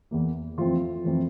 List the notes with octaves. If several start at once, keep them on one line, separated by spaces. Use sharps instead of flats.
E2 E3 A#3
F2 E3 A3 C4 F4
F2 E3 A3 C4